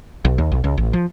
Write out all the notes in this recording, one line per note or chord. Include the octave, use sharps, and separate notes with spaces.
B1
D#2
B1
C#2
A1
F3